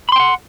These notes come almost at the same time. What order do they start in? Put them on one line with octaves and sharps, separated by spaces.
B5 C6 G5 F#5